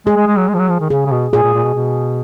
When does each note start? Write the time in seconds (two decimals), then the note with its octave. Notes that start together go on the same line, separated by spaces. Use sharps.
0.06 G#3 G#4
0.17 G#3
0.27 G#3
0.38 F#3
0.49 G#3
0.54 F3
0.59 F#3
0.69 F3
0.81 D#3
0.90 C#3 G#4
1.06 C#3
1.12 B2
1.33 A#2 G#4
1.44 A#2
1.54 A#2
1.64 B2
1.75 B2